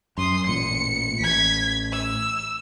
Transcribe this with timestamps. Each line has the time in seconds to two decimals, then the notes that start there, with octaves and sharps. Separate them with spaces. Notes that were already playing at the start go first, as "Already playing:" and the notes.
0.18 F#2 C6 D#6
0.47 A1 A#2 C#7
1.21 A1 G#6 B6
1.92 E6